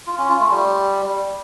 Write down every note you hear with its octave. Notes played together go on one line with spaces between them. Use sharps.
F4
C#4
F4
A3
G3